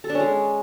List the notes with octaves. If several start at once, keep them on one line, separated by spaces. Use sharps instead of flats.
A4
D4
C#4
G#3